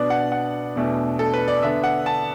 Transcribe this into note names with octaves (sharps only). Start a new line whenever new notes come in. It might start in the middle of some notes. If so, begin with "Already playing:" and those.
Already playing: B2 B3 D4 D5
F#5
F#5
E2 B2 A3 D4
A4
B4
D5
D3 B3 D4 E5
F#5
A5